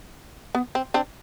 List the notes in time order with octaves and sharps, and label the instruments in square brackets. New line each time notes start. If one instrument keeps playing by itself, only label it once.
[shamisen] B3
C4
C4 D4